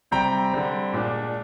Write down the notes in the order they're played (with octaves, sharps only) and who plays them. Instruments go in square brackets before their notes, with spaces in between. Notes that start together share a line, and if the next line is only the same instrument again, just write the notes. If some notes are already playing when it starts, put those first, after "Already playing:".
[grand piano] C3 G3 C4 G5 A#5
D3 G3 C4
A#2 G#3 D4